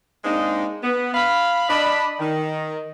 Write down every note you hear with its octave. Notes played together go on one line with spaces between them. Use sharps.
G#3 A#3 C4 D4 D#4
B3
F5 B5
D4 D#5 B5
D#3